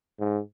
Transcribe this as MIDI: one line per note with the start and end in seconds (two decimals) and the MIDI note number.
0.20 0.39 44